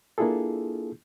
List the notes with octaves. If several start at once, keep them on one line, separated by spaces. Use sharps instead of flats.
A#3 D4 E4 F4 G#4 A4